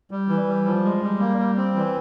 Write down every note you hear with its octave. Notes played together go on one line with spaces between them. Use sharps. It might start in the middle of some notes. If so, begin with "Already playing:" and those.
G3
E3
G3
F3
G#3
G3
A#3
G3
C4
E3